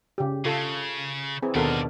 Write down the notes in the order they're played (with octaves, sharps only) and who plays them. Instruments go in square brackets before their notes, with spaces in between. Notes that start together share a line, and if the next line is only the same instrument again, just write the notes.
[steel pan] C#3 G4
[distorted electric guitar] C#3 [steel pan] F4 A4
[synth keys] E3 [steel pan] C4 G#4
[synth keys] D#2 B2 D3 [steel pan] D#3 A4 A#4 [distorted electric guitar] D5 F5